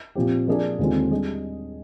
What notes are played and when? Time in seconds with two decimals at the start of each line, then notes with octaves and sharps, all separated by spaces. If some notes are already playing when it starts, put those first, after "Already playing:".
0.15 A#2 F3 C4 G4
0.47 F3 A#3 D4 G#4 D5
0.79 D#2 D3 G#3 C4 F4
1.11 G3 D4 G#4 D#5